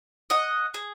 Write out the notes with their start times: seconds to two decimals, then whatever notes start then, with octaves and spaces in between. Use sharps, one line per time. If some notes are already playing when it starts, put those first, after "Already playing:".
0.30 D#5 F#5
0.74 G#4